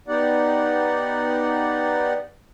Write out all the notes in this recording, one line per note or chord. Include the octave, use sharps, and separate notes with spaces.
B3 D#4 G4 D5 F#5